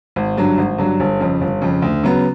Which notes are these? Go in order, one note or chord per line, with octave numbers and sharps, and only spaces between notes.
G#1
G2 D3 F#3
G#1
G2 D3 F#3
G1
F2 C#3
G1
F2 C#3
D2
C#3 F#3 B3